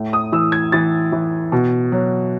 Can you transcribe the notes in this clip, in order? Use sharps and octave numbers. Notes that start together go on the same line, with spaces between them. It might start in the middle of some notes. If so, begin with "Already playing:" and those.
Already playing: A2
D#6
E3 E6
G#6
E3 A6
E3
B2
F#3